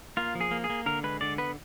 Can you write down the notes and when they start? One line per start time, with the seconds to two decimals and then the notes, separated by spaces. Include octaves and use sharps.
0.17 A#3 F4
0.35 F3
0.41 G#4
0.51 A#3
0.64 G#4
0.70 A#3
0.86 D3 A#4
1.03 G#3 B4
1.21 D3 D5
1.38 B3 B4